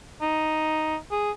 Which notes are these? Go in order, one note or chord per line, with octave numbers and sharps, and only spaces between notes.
D#4
G#4